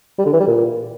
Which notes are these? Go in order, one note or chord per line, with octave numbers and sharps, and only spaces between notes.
G3
D3
E3
G3
A#2